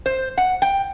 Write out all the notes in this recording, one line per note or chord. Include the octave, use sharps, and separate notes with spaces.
C5
F#5
G5